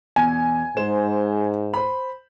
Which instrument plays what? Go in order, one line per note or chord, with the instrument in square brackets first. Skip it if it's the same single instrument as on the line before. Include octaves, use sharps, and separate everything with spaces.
[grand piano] E2 B2 [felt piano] G#5
[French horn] G#2 [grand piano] G#3 C5 E7
[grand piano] C5 B5